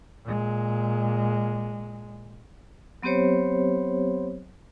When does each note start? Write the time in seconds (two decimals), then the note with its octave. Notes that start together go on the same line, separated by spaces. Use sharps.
0.24 A#2 G#3
3.02 F#3 B3 C4 G4 C5 C#5